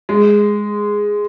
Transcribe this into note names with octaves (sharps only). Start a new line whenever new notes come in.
G#3